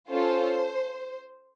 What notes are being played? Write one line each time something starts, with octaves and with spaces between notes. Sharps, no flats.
C#4 F4 A4 C5